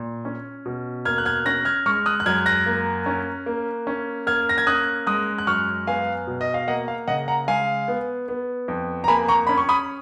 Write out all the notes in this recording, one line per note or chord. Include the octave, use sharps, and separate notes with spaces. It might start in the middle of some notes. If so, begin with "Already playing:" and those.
Already playing: A#2
C#4
B2
A#3 F6 G#6
F#6
F6 G#6
C#4 F#6 A#6
F6 G#6
G#3 C#6 F6
D#6 F#6
F#6
F#2 F6 G#6
F#6 A#6
A#3
C#4
A#3
C#4
A#3 F6 G#6
A#6
G#6
C#4 D#6 F#6
G#3 D#6 F#6
F#6
F#2 C#6 F6
B3 F5 G#5
B2
D#5
F5
A#3 D#5 F#5
F5
C#3 D#5 F#5
F#5 A#5
G#3 F5 G#5
B3
B3
F2
A#5
A#3 G#5 B5
A#5 C#6
C#4 B5
C#6
B5 D#6